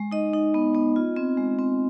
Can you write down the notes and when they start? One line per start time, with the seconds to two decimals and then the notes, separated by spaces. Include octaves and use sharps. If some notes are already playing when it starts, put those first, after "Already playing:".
Already playing: G#3
0.12 D#4 D#5
0.33 D#4
0.54 B3
0.75 B3
0.96 F4
1.16 C4
1.37 G#3
1.59 C4